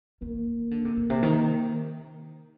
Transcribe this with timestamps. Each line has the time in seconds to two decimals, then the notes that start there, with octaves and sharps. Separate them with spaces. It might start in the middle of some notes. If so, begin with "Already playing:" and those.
0.22 D#3 A#3
0.47 D#3
0.71 D3
0.85 C3
0.97 A#2
1.10 C3
1.23 D#3